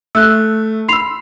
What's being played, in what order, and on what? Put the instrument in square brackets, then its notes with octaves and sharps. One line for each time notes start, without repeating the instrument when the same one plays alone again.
[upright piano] A3 [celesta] E6 F#6
[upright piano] B5 E6 [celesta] C6 C7 F7